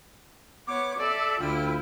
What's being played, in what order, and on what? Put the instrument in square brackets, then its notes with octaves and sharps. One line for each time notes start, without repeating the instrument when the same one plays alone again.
[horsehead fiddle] B3 C#5 [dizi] D6
[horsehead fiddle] A4 E5 [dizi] D5
[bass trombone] D2 [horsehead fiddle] E4 F4 [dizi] G5